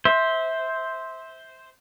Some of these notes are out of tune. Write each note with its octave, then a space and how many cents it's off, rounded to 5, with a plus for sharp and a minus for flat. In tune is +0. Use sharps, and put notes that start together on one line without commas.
C5 +0 E5 -20